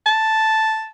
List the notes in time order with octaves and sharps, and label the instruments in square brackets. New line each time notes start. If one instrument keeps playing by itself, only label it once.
[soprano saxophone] A5